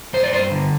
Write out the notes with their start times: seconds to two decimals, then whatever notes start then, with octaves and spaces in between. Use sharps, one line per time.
0.13 G2 C5
0.23 D5
0.33 G2 C5
0.51 D3